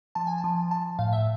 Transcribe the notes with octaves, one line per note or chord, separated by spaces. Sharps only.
F3 A5
G#5
A5
F3
F3 A5
A2 F5
E5